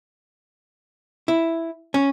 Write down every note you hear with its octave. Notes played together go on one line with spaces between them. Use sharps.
E4
C#4